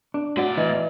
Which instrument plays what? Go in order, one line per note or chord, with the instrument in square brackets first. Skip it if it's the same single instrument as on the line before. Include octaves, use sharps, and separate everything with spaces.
[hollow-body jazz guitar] D4
[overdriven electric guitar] A2 D5 [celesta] F#4 F#5
[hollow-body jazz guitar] E3 [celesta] D#5